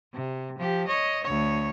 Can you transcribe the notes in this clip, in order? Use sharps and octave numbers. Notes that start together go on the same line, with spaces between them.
C3
F3 G4
C#5 D#5
D2 C#5